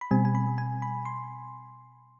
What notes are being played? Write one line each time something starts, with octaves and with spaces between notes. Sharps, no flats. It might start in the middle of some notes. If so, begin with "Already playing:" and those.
B5
B2 G3 C4 G#5
G#5
B5
G#5
B5
C6